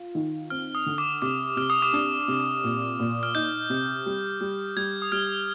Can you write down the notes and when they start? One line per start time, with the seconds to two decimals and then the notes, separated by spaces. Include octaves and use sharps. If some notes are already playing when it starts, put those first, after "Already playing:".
Already playing: F4
0.15 D#3
0.50 C4 F6
0.75 D#6
0.86 D3
0.98 D6
1.22 C3 D6
1.57 C3 F6
1.70 D#6
1.82 D6
1.93 D4 D#6
2.28 C3
2.64 A#2
3.00 A#2
3.23 F6
3.35 D#4 G6
3.70 C3
4.06 G3
4.41 G3
4.76 G3 G#6
5.02 D#6
5.12 G3 F6